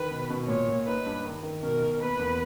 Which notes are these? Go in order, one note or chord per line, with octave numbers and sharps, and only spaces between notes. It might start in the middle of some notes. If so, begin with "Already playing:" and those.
Already playing: D#3 B4
B2
B2
A#2 C#5
A#2
D#4 B4
G2
D#3
D#3
B2 A#4
B2
A#3 B4
E2